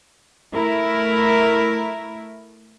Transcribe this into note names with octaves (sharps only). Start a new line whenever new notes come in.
A3 E4 A#4